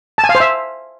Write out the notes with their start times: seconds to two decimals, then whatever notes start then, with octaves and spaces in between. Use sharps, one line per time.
0.18 A5
0.24 G#5
0.29 F5
0.35 C5
0.40 E5